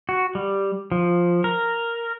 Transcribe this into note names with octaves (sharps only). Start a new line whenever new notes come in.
F#4
G3
F3
A#4